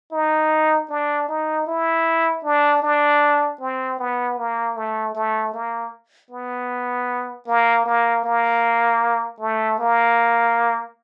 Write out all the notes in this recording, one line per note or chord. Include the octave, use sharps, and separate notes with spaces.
D#4
D4
D#4
E4
D4
D4
C4
B3
A#3
A3
A3
A#3
B3
A#3
A#3
A#3
A3
A#3